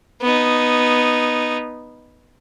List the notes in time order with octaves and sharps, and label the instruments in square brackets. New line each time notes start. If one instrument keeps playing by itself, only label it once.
[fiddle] B3 D#4